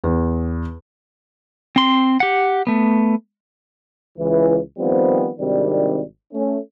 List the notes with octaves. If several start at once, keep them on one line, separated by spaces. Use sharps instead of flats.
E2
C4 C6
G4 F#5
A3 B3
C#2 E3
D#3 F3 G3 B3 C4
G#1 C3 D#3 G3 D4
A3 C#4